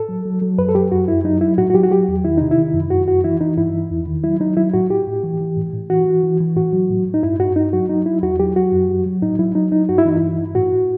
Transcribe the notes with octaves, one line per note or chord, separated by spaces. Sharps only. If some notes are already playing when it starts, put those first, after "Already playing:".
Already playing: A2 A4
F#3
F#3
F#3
F#2 B4
A4
F#3 G4
F#2 F#4
F#2 E4
F#3 D#4
F#3 E4
A2 F#4
F#4
F#3 G4
F#4
F#3 G4
E2
D#3 E4
C3 D#4
E4
D#3
F#2
F#2 F#4
F#2 F#4
E3 E4
E3 D#4
G2 E4
E3
E2
D#3
F#3 E4
F#3 D#4
F#3 E4
A2 F#4
A2 G4
A2
E3
E3
A2
A2
E3 F#4
E3
E3
E3
A2 F#4
F#3
A2
A2
D#4
G2 E4
G2 F#4
G2 D#4
F#3 F#4
F#3 D#4
F#3 E4
E2 F#4
F#3 G4
F#3 F#4
F#2
F#3
F#3
A2 D#4
F#3 E4
F#3 D#4
F#3 D#4
G2 F#4
E4
E3 D#4
E4
G2
G2
A2 F#4
A2